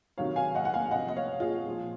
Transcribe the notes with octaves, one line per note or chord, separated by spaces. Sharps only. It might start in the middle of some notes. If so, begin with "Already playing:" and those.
C3 D#3 F#3 C#5 F5
F5 G#5
D#5 F#5
F#5
F5 G#5
C3 F3 D#5 F#5
D#5
C#5 F5
F4 G#4
A#2 F3